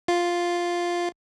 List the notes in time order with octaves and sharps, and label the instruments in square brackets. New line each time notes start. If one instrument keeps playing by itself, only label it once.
[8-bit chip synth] F4